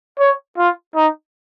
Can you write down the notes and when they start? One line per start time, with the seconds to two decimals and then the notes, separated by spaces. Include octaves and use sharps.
0.19 C#5
0.58 F4
0.95 D#4